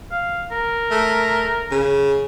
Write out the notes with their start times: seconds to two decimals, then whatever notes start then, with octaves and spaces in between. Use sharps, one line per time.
0.12 F5
0.51 A#4
0.91 A3
1.72 C#3